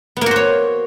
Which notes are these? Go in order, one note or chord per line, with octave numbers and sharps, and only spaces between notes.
A#3 B3 F#4 C5 C#5